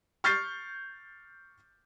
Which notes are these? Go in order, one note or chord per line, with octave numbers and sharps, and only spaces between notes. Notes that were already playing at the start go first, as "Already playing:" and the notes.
C#6 F6 G6 A6 C7